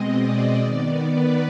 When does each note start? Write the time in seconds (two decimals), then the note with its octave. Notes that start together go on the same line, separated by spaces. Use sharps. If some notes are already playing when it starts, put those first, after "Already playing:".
Already playing: B2 G#3 C4 D#5
0.08 D5
0.60 D#3 B3
1.12 B4